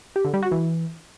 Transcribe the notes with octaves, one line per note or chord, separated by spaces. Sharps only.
G4
D3
G3
F#4
E3